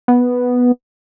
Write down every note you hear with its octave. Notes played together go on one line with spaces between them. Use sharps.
B3